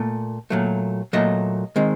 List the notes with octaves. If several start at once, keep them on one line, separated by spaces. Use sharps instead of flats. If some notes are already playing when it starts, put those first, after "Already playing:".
Already playing: A#2 A3
A#2 F#3 A3
A#2 F#3 A3 D#5
D#3 G#3 C4